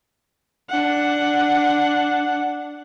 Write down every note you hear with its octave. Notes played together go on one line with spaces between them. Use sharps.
D4 F#5